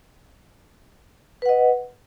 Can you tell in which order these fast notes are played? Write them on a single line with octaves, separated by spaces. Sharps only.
B4 F#5 D#5